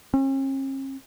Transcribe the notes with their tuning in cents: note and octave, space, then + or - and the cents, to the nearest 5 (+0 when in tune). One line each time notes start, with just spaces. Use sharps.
C#4 -45